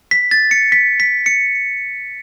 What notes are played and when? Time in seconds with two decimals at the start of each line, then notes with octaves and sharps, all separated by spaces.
0.11 B6
0.31 A6
0.51 C#7
0.72 B6
1.00 B6
1.26 C#7